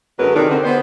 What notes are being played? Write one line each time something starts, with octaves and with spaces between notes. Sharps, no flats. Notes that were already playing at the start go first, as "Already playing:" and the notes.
F#2 D3 F#3 G#3 A#4 B4
C3 D#3 D4
D3 C4
B3 C5